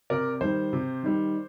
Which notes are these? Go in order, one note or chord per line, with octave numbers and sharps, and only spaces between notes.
C3 A#4 D5
D#3 G3 C5
C3
D#3 G3